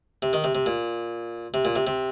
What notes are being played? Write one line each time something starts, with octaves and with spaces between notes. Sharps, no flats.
C3
D#3
C3
C3
A#2
C3
A#2
C3
C3